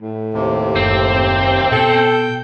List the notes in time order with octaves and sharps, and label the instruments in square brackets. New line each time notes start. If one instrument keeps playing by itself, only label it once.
[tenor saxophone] A2
[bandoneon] D#2 C3
[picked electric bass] F#1 [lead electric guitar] C4
[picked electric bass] B2 [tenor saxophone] A4 [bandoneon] G5 G6